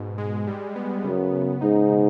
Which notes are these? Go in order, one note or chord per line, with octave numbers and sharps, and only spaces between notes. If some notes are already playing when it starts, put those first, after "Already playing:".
Already playing: G#2 B2
G#3
G3
B3
F#2 C#3
C#3
G#2 D#4
B2